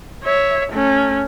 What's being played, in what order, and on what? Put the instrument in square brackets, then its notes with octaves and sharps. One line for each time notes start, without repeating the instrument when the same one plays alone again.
[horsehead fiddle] C#5 E5
A3 C#4